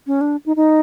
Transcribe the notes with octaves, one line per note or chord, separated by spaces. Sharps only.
C#4
D4
D#4
D#4